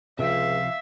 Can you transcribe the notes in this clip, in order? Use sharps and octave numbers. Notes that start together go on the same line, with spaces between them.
C#2 C3 F3 E5 F5